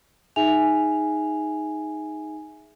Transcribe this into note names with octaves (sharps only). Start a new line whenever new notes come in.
D#4 G#4 E5 G#5 F7